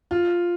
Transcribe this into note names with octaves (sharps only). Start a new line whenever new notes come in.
F4